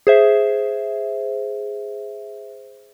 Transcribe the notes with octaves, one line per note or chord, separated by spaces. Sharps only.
G#4 C5 E5